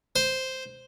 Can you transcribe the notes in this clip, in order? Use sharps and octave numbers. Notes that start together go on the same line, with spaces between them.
C5